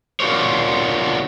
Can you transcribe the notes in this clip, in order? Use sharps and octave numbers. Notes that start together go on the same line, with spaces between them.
D4 F4 F#4 A#4 C5 C#5